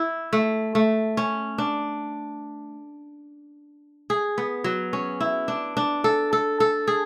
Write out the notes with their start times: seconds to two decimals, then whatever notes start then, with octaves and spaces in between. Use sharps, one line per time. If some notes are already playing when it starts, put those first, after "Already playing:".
Already playing: E4
0.33 A3
0.75 A3
1.17 C#4
1.58 D4
4.10 G#4
4.38 B3
4.64 F#3
4.93 C#4
5.21 E4
5.48 D4
5.77 D4
6.04 A4
6.33 A4
6.60 A4
6.88 G#4